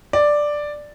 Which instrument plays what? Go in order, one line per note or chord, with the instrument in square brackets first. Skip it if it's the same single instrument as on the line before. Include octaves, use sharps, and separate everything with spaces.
[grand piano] D5